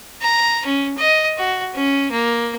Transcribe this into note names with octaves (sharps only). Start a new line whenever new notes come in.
A#5
C#4
D#5
F#4
C#4
A#3